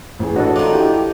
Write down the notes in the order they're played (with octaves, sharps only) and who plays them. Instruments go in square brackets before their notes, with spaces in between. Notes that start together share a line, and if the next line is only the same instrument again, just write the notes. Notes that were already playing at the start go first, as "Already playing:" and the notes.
[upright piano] A1 G#4
[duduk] D4 [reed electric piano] F#4 A4 [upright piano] C#5 D#5
[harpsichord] D#3 F3 [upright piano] D6
[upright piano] E4 [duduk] G4